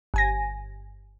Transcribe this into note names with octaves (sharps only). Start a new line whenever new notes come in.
G1 G#5 A#6